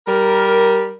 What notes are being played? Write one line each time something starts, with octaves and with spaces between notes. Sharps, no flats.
G3 A#4